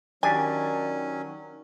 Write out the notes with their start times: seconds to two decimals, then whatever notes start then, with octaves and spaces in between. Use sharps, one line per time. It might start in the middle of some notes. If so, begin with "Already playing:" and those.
0.23 D#3 F#3 C#4 D4 G4 G#5